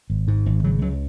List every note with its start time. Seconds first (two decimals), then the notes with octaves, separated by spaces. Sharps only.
0.10 G#1
0.28 G#2
0.46 G#1
0.64 C#3 F#3
0.82 C#2 F#3